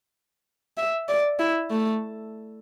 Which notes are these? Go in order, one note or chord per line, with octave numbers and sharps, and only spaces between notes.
E5
D5
E4
A3